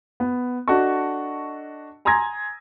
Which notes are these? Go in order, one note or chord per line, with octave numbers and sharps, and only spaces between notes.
B3
D4 F#4 A4 D#5 A5 C#6
G#5 A#5 C6 D#6 G#6 A#6